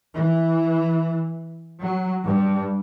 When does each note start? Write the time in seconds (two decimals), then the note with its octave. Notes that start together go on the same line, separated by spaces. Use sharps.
0.14 E3
1.79 F#3
2.25 G2